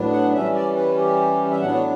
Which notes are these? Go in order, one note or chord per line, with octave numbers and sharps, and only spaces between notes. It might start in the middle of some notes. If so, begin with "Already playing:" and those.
Already playing: A2 F#3 B3 D4
F#5
E3 G3 C#4 E5
D5
B4
G4
E5
A2 F#3 B3 D4 F#5
C#5